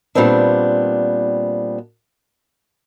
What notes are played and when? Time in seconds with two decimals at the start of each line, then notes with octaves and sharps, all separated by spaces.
0.15 A#2 G3 B3 C4 D4